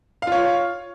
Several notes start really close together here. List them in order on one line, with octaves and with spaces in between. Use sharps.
F5 F4 C#5